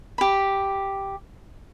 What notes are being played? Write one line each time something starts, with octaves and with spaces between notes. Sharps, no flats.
G4 B5